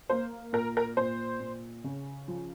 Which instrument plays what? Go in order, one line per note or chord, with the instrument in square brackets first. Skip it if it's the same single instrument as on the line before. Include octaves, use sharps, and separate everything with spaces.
[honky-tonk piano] A#3 C5
A#2 A#4
A#4
A#2 C5
A#2
C#3
F3